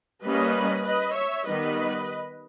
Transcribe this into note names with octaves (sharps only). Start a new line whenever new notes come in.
G3 A#3 C#4 B4 D#5
B4 D#5
C#5 E5
D#3 G3 B3 B4 D#5